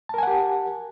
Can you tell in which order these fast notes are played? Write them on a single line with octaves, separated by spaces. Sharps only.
A5 A#4 G#5 F#5 G4